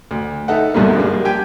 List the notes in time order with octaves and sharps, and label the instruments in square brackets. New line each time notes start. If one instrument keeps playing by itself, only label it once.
[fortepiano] D2
D#4 A4 E5 F#5
C2 G2 B2 D3 G3 A#3
F#2 G3 G#3 A#3
G4 G5 G#5